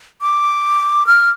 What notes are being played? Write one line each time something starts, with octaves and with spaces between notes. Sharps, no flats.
D6
F6